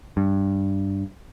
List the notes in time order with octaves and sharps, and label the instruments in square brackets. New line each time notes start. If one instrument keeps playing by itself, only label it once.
[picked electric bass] G2